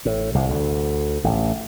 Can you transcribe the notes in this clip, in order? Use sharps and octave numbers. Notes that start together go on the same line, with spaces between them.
A1 A2
C2 C3
D2 D3
A1 A2